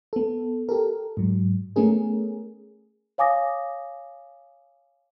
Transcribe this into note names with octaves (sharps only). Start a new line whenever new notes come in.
B3 A4
G4 A4 A#4
G#2 F#3
A3 B3 C#4 G#4 A#4
C#5 F5 G#5 D6 D#6 A#6